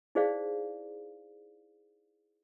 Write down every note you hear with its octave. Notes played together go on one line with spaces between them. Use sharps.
D#4 E4 G#4 C5 D5 F5